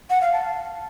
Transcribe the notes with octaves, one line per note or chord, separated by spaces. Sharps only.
F#5
F5
A5